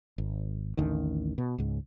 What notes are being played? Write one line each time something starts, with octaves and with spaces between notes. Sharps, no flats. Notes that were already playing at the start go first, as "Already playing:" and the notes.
G#1
A1 D#2 D3 D#3
B2
C#2 G#2